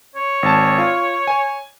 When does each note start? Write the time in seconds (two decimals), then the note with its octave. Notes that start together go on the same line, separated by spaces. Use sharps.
0.16 C#5
0.43 G#1 A5
0.78 F4
1.27 G#5